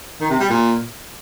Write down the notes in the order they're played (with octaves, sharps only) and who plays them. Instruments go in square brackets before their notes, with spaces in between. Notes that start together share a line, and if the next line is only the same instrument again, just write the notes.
[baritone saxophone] D#3
C3
G3
A#2